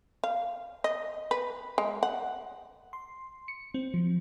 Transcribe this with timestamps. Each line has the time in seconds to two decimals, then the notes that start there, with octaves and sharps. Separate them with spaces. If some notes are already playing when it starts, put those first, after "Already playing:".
0.24 F5
0.84 D#5
1.31 B4
1.78 G#3
2.03 F#5
2.93 C6
3.48 C#7
3.74 C4
3.94 F3